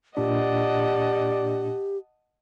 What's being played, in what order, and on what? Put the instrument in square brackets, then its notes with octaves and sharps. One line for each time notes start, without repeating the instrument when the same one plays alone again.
[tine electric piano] A#2 D4 [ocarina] G4 [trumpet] D5 [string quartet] D#5 F#5 A5